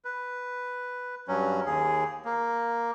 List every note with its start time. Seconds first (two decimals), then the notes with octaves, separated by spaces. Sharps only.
0.05 B4
1.28 G2 F#3 C#4
1.66 D#2 G#4
2.25 A#3